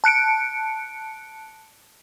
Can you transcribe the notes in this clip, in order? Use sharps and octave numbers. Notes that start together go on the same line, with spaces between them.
A5 F#6 C#7 D7